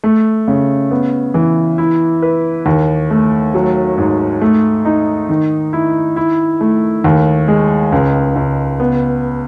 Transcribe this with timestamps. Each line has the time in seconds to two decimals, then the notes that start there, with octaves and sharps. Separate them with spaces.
0.04 A3
0.48 C#3
0.91 B3
1.34 E3
1.78 E4
2.22 B4
2.66 D#2
3.10 A3
3.54 F#3
3.98 G#2
4.41 A3
4.85 D#4
5.29 D#3
5.73 E4
6.16 E4
6.61 A3
7.04 D#2
7.48 G#3
7.92 C#2
8.36 C#2
8.80 B3